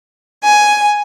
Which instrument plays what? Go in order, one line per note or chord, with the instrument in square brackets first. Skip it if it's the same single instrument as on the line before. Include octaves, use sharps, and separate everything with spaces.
[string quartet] G#5